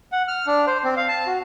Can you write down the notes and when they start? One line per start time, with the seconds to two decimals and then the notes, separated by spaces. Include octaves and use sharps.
0.12 F#5
0.28 F6
0.47 D4
0.67 C5
0.84 C4
0.97 F5
1.08 A5
1.27 F#4